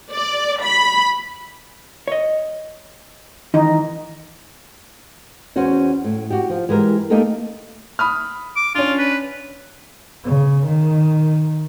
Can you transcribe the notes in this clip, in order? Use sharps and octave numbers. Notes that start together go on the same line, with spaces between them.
D5
B5
C#5 D#5
D#3 E3 D#4
E2 C#4 F#4 C5
A2
F#4 G4
F3
E3 G#3 G4 A#4
A3 A#3 D#4 G4 A4 A#4
B5 D#6 F6
D6
C#4 D4 F4
B4
C#3
D#3